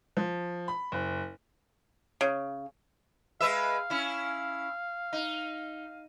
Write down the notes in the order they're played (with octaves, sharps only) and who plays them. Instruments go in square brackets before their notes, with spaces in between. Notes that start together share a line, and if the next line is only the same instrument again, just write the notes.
[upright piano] F3
B5
F#1
[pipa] C#3
[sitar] G#3 B4 E5 [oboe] F5
[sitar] C#4 E4
D#4